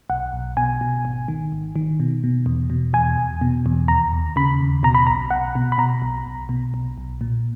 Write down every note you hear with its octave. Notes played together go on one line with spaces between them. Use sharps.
B1 F#5
B1
B2 G#5
B2
G#1
D#3
G#1
D#3
B2
B2
E2
B2
E2 G#5
E2
B2
E2
D#2 A#5
D#2
C#3 B5
D#2
B2 A#5
B5
B1 A#5
B1 F#5
B2
B5
B2 A#5
B1
B1
B2
B1
B1
A#2